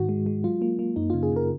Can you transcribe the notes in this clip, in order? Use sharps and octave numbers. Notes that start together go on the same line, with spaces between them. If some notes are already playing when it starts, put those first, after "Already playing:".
Already playing: G#2 D#3 F#4
G#3
G#3
F#3 F4
A#3
A#3
F#2 D#4
C#3 F4
G#4
C#3 A#4